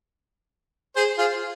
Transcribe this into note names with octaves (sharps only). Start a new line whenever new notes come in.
G#4 C5
F4 G#4